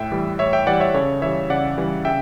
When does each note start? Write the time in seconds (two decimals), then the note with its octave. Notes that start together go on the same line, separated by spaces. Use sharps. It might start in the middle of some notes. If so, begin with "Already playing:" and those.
Already playing: A2 E5 G5
0.12 E3 G3
0.39 A2 C#5 E5
0.53 E5 G5
0.67 E3 G3 D5 F#5
0.80 C#5 E5
0.94 C#3 A4 C#5
1.22 E3 G3 C#5 E5
1.50 C#3 D5 F#5
1.78 E3 G3
2.05 C#3 E5 G5